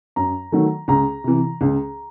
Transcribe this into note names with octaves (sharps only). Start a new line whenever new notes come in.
F#2 A#5
D#3 F#3 A3
C#2 A#5
C3 E3
C#2